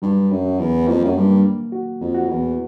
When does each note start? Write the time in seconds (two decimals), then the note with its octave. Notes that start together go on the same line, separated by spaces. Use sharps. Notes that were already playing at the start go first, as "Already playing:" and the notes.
0.02 G2 F#3
0.31 F#2
0.45 F#3
0.59 E2
0.88 F2 A#3
1.04 F#2
1.16 G2
1.30 A#3
1.72 F#4
2.01 F2
2.15 F#4
2.29 E2